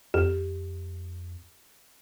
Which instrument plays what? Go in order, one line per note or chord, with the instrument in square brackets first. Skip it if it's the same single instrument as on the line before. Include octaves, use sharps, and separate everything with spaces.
[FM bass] F2 [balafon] G4